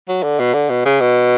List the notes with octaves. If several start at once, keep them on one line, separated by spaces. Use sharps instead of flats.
F#3
D3
B2
D3
B2
C#3
B2